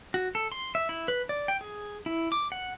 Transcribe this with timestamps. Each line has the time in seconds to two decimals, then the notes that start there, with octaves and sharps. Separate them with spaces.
0.14 F#4
0.35 A4
0.52 C6
0.75 E5
0.89 E4
1.08 B4
1.29 D5
1.48 G5
1.61 G#4
2.06 E4
2.32 D6
2.52 F#5